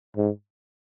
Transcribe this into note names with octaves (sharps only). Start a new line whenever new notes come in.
G#2